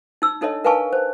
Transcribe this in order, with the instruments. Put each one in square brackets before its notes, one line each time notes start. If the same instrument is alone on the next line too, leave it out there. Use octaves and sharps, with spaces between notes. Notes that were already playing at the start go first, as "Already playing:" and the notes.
[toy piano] D#4 E6
D4 D#4 A4 C#5 D#5
A#4 B4 F5 G#5 A5 C#6
C5